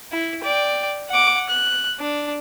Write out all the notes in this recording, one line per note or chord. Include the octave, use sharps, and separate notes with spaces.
E4
D5 G5
F#5 D6
F#6
D4